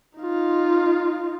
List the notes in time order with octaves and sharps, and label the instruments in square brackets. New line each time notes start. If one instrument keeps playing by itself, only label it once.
[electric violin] D#4 F4